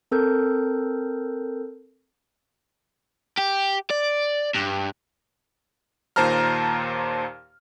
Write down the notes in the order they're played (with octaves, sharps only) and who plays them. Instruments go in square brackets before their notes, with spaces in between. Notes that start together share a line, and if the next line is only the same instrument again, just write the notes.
[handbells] C4 A4 A#4 G6
[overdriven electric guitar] G4
D5
G2
[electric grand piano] D#2 A#2 C5 A5 A#5 F6